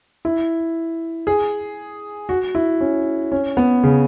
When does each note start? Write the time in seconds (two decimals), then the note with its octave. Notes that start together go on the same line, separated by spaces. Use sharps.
0.25 E4
1.27 G#4
2.29 F#4
2.55 E4
2.81 C#4
3.32 C#4
3.57 B3
3.83 C#3